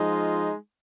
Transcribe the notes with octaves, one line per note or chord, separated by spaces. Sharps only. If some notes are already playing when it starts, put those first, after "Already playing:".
Already playing: F3 G#3 D#4
F4